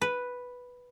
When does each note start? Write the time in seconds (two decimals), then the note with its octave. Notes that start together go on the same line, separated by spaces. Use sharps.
0.01 B4